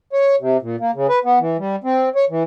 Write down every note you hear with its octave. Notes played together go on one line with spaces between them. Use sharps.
C#5
C3
A#2
A#3
C#3
B4
B3
E3
G3
C4
C#5
E3